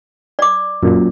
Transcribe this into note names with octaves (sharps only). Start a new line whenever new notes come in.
D5 D6
F#2 A#2